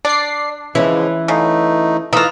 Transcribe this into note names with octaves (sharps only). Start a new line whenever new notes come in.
D4 D5 C7
C#3 E3 F3 G#3 C#4 E4
C#3 A3 D#4
E3 A3 A#3 D#4 F4 E6 A#6